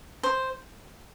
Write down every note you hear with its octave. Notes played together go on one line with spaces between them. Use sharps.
C5